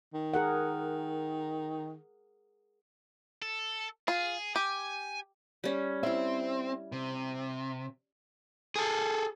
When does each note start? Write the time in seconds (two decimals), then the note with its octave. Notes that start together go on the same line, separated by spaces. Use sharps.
0.14 D#3
0.34 G#4 A#4 F#5
3.42 A4
4.08 F4 G#4
4.56 G4 G#5
5.64 G3 C#4
6.03 C4 E4 E5
6.92 C3
8.76 G#4 A4